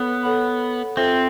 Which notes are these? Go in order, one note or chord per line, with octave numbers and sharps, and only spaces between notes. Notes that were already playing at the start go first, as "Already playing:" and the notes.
Already playing: B3 A4 C#5 F#5 B5
A4 C#5 F#5 B5
C4 F4 A4 C5 E5